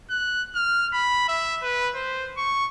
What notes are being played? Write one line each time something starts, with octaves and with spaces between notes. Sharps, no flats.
F#6
F6
B5
E5
B4
C5
C#6